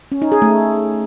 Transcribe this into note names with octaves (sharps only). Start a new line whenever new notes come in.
C#4
D#4
G#4
A3